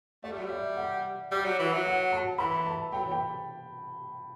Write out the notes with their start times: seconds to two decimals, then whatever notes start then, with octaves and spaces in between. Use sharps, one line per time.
0.24 A3 D5
0.31 G3
0.38 F#3
0.46 G3 E5
0.77 F#5
1.32 G3
1.45 F#3
1.59 E3
1.73 F#3
1.86 F#5
2.12 A5
2.38 E3 B5
2.66 A5
2.93 F#3 G5
3.04 E3
3.11 G5